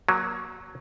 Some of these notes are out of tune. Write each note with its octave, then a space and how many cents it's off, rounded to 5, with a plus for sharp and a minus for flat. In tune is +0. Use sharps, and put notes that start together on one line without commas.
F#3 +0 A#3 +25